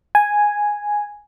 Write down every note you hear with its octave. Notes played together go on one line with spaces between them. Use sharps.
G#5